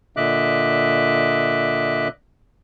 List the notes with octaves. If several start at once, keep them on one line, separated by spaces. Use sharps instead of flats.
A#2 D3 D#5 E5 D6 F#6